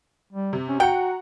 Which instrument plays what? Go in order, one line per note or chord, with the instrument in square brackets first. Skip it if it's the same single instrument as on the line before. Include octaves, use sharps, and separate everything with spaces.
[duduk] G3
[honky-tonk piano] C3
[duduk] C#4
[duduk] F#4 [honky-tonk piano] F#5 A#5 C#7 [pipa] G5